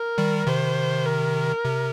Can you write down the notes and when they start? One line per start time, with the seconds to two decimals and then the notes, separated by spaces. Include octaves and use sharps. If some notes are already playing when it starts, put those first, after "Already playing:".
Already playing: A#4
0.18 D#3 G3
0.47 C3 D#3 C5
1.06 A#4
1.65 C3